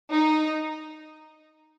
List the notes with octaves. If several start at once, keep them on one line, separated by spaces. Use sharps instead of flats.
D#4